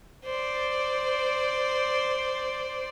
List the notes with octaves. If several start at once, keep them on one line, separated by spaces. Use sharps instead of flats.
C5 D5